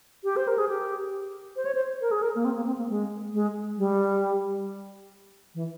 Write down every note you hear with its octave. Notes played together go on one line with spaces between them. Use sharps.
G4
C5
A#4
G#4
G4
C5
C#5
C5
A#4
G#4
A#4
A#3
C4
A#3
C4
A#3
G#3
G#3
G3
E3